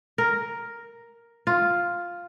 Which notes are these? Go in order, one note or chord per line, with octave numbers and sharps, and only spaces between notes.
A#4
F4